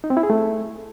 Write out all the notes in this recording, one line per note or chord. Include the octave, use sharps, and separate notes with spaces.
D#4
C4
E4
G#4
A3